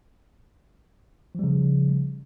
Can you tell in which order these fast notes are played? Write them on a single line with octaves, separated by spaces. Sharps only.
F3 G3 C#3